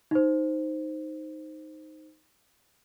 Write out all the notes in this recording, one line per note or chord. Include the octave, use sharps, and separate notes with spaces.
D#4 C5